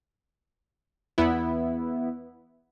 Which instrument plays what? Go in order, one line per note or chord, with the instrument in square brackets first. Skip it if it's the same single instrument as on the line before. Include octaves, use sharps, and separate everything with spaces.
[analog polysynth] E2 B3 E4